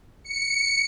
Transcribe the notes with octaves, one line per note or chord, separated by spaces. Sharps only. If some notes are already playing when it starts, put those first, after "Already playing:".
C#7